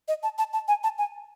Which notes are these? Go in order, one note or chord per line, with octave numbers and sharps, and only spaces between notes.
D#5
A5
A5
A5
G#5
A5
G#5